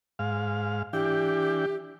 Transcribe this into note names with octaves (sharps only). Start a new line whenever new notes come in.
G#2 F5
E3 D4 G4 G5